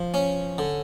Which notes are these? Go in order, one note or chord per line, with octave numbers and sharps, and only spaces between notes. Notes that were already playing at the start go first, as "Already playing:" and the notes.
Already playing: F3
C#4
D3